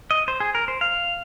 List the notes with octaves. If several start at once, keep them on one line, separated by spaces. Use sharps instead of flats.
D#5
C5
G#4
A#4
C5
F5